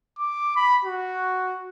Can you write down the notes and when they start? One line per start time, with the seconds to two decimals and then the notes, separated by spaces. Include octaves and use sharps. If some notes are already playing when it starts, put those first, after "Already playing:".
0.19 D6
0.56 B5
0.85 F#4